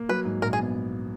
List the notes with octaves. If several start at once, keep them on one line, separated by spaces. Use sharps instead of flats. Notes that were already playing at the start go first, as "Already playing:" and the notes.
Already playing: A#3
F#3 B4
G#2
A#1 A#4
G#4
B3